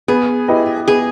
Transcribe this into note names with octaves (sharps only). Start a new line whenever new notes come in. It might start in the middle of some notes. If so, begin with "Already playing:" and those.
B3 G#4
E4 G4 B4 D#5
B3 G#4